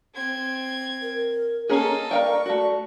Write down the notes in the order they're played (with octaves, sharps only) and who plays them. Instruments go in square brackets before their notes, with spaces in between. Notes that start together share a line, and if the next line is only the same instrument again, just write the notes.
[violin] C4 G#6
[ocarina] A#4
[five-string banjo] A#3 C#4 G#4 [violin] A4 D#5
[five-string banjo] A#4 F5 G5 [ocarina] D5 [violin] C#6
[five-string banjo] A3 F#4 [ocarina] D5